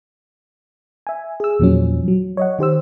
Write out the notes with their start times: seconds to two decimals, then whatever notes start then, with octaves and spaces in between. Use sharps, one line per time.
1.07 E5 G#5
1.40 G#4 E6
1.59 E2 A#2 F3 F#3 C#4
2.08 F#3
2.37 C#5 D#5 F#5
2.59 D#3 G4 C5 E6